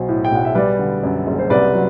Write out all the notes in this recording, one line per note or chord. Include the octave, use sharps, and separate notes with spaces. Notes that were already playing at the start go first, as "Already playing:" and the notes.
Already playing: B1 F#3 C5
A2
G5
B1 F#5
E5
G3 B4 D5
D3
F#2
F#1
C5
C2 B4 D5
F#3